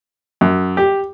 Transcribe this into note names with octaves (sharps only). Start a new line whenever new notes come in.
F#2
G4